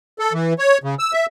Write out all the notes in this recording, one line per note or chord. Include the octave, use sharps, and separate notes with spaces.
A4
E3
C#5
C#3
E6
E5